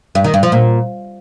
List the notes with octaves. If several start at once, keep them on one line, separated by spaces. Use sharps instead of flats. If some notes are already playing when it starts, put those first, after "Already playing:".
G2
D#3
G2
F3
A#2